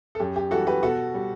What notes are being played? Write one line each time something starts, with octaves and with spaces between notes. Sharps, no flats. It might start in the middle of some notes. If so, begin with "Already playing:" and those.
A4
F#2 G4
G4
E3 G3 F#4 A4
G4 B4
B2 F#4 A4
G3